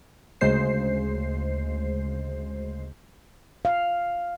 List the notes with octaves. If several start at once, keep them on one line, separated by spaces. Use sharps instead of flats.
D2 C#3 G#3 C5 C7
F5